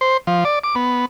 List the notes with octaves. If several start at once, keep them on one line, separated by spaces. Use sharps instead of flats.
C5
F3
D5
D6
B3